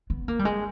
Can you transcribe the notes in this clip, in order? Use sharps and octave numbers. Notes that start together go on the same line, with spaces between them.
B3
A#3
G3
G#3